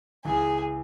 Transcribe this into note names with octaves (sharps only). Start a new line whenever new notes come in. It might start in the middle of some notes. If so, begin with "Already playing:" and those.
C#2 C#3 E3 G#4